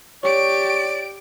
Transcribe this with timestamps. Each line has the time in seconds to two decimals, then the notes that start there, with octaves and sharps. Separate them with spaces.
0.23 G4 C#5 D5 C#6 D7